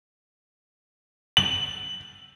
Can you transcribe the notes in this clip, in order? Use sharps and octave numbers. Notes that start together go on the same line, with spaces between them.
F#7